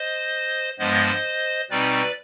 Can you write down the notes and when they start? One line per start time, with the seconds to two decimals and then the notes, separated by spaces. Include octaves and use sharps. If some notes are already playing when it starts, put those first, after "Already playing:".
Already playing: C5 D#5
0.79 G2 F3 G#3 B3 C5 D#5
1.70 B2 G3 C4 D#4 B4 D5